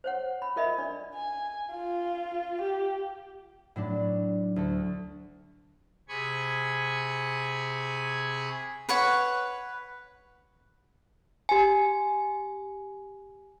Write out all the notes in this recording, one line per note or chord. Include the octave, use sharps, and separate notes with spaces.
C5 C#5 F#5
B5
F4 A#4 D#5 E5 B5
D4 D5
G#5
F4
G4
A2 F#3 D4
D2 A4
C3 G#4 G#5 B5 C#6 G#6
B4 C#5 F#5
G4 G#5